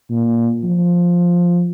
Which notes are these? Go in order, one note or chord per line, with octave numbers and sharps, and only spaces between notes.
A#2
F3